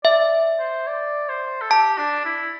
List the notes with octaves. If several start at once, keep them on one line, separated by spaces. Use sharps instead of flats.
D5 E5
C5
D5
C5
A4
G4 A5
D4
E4